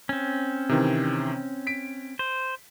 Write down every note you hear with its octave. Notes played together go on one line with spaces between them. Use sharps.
C4 C#4
C3 D#3 E3
B6 D7
C5